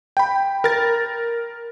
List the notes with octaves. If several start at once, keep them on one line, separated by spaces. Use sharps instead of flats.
G5 B5
A#4 A6